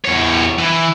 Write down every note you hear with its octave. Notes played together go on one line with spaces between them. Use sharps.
E2 C#5
E3